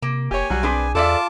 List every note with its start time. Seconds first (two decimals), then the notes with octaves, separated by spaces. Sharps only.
0.02 C3 A#3
0.31 F1 G4 C#5 G#5
0.50 B1 F#3 G3 F#4
0.63 C4 D4 G#4 B4
0.95 E2 F4 A4 D5 E5 A5 D6